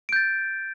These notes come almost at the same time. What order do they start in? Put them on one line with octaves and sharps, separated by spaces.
D7 G6 A6